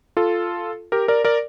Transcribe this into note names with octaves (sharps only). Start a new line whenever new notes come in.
F4 A4
G4 A#4
A#4 D5
A#4 D5